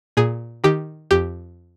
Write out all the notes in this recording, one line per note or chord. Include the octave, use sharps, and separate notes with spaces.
A#2 G#4
D#3 G4
F2 G4